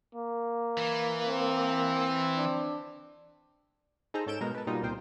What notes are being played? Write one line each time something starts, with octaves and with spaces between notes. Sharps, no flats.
A#3
E3
C4
D4
D#4 G#4 A4 C5 A#5
G#2 C#4 A4 G6 D7 E7
B2 G#3 A#4
B4 A5
B2 G3 A#3 D#4 F4
C2 A#2 A#4 C5 G5